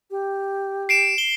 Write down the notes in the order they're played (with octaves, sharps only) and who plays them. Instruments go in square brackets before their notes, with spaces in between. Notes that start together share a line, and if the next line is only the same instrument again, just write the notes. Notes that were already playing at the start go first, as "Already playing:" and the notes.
[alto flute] G4
[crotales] C7 D7 E7
G7